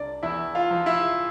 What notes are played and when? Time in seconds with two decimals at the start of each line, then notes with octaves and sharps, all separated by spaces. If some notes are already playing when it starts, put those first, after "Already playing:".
Already playing: C2 D4 D5
0.23 E2 E4 E5
0.55 F4 F5
0.71 F3
0.86 E4 E5